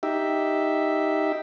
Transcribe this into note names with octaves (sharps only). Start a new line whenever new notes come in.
D#4 G4 E5